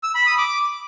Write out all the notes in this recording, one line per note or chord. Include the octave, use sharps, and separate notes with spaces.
E6
B5
D#6
D6